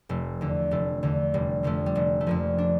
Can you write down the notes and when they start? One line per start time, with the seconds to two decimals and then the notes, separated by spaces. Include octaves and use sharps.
0.09 F1 A3
0.41 E2 D3
0.71 F1 A3
1.03 E2 D3
1.34 F1 G3
1.63 F2 D3 F3 A3
1.86 G3
1.95 F1 A3
2.21 A3
2.26 F2 D3 F3 A#3
2.58 D4